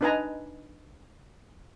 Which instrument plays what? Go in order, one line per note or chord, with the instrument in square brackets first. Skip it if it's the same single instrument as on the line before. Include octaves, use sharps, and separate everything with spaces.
[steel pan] D4 D#4 B4 D#5 G#5 A#5